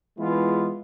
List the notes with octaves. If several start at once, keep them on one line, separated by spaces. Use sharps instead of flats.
E3 G#3 B3 E4 F4 G#4